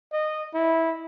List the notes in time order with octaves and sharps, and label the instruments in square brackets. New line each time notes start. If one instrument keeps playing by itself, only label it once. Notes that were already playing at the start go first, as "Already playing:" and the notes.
[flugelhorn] D#5
E4